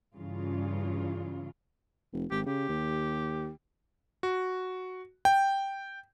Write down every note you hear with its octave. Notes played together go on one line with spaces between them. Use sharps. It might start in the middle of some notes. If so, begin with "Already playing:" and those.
G2 C#3 E3 F4
F1
G#1 G4
C#3 G4
D#2
F#4
G5